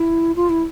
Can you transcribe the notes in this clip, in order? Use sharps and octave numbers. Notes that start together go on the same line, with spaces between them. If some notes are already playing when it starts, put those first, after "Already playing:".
Already playing: E4
F4
E4